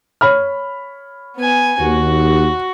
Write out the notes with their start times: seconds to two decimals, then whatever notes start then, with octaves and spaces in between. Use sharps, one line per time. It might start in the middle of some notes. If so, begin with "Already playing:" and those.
0.21 C#5 B5 F6
1.36 B3 G#5
1.79 D#2 F#4